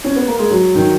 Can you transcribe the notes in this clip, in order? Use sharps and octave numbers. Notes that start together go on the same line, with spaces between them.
C#4
B3
A#3
G#3
F#3
D#3